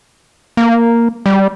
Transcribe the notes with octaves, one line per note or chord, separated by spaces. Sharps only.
A#3
G3